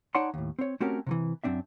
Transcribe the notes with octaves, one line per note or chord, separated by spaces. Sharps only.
D#4 C#5 D5 F#5 A5 C6
D#2 A2
C4 C#5
A3 C4 C#4 F#4 G4 A#4
C3 D#3 E3
F#2 A#2 C4 D4 E5